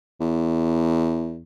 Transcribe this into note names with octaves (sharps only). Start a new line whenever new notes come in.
E2